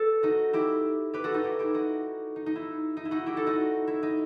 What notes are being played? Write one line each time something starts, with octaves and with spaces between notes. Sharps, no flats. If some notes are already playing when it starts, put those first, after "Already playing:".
Already playing: A4 B4
D#4 F#4
E4 G4
G4 B4
F#4 A4
D#4 F#4
E4 G4
E4 G4
D#4 F#4
D#4
D#4
E4
D#4
E4
D#4 F#4
E4 G4
F#4 A4
D#4 F#4
E4
D#4